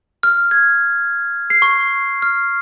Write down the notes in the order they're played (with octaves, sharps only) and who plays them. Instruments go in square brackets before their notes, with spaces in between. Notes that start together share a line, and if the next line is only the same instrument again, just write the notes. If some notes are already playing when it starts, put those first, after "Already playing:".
[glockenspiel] F6
G#6
C7
C#6
F6